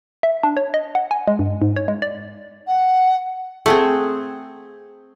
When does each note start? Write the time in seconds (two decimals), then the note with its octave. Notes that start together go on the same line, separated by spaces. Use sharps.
0.23 E5
0.43 D4
0.57 C#5
0.74 D#5
0.95 F#5
1.11 G#5
1.28 G#3
1.39 G2
1.62 G#2
1.76 C#5
1.88 G#3
2.02 D5
2.67 F#5
3.66 A3 C4 G#4 F#5